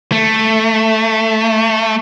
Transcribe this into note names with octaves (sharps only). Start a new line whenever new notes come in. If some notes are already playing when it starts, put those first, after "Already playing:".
A3